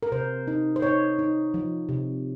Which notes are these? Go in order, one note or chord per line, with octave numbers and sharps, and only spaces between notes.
A#4
C3 C5
D#4
C5
D#4 C#5
D#4
F3
C3